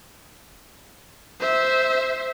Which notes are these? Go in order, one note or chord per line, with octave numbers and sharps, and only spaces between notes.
C5 E5